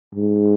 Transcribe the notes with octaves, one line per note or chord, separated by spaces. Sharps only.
G#2